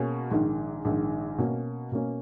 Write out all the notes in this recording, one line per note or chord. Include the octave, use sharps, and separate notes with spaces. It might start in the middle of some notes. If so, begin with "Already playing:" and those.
Already playing: B2 A#3 C#4 G#4
A#1 G#2 D#3
A#1 G#2 D#3
B2 A#3 C#4
B2 A#3 C#4